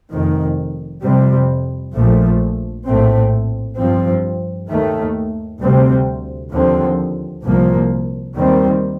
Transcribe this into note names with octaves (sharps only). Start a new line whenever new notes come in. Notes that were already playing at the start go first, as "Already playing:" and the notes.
F1 F2 D#3
F2 C3 G3 C4
A#1 A#2 F3 A3
A#1 A2 A3 C4
G2 F3 C4
D#2 D#3 A3
D2 C3 G3 C4
D#2 D3 F3 C4
C2 A#2 F3 A#3
D#2 D#3 G3 C4